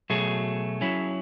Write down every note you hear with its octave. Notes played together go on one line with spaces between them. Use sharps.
B2 F#3 A3 G#4
F#3 C#4 E4